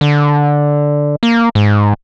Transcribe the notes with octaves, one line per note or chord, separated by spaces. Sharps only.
D3
A#3
G#2